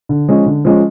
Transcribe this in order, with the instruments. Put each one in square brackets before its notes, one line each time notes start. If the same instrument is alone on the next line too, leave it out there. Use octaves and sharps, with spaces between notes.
[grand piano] D3
F3 G#3 C#4
D3
F3 G#3 C#4